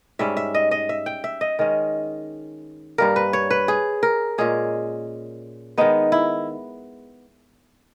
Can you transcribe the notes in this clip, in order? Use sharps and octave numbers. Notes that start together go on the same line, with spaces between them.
G#2 G3 C#4 E5
E5
D#5
D#5
E5
G5
E5
D#5
D#3 G#3 C#4
G2 G3 A#3 A#4
B4
C#5
B4
G#4
A#4
A#2 G#3 C#4 G#4
D#3 G#3 B3 D#4
E4